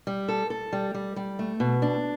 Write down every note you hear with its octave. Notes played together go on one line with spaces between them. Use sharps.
G3
A4
A4
G3
G3
G3
A3
B2
D4